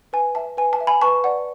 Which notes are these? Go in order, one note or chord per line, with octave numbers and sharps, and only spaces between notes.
B4 G#5
E5 A5
B4 G#5
A5
E5
G#5 B5
B4 A5 C#6
D5 F#5